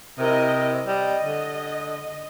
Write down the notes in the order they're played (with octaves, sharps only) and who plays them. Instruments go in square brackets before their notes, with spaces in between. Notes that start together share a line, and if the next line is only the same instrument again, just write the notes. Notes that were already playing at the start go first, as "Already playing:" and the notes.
[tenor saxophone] C3 [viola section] E4 A#4 D#5
[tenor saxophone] G3 [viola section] D#5
[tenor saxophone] D3